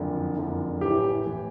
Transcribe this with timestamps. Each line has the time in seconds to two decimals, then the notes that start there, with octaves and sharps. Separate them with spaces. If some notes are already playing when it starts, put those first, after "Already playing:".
Already playing: F#1 F2 D3
0.37 F#1 F2 D3
0.81 A1 A2 E3 G4
1.26 A2 E3